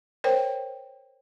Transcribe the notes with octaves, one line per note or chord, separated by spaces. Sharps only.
A#4 C5 C#5 G5